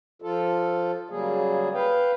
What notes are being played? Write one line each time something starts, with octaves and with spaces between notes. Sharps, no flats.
F3 F4 A4
C#3 F#3 G3 A#3 G#4
B4 F5 G5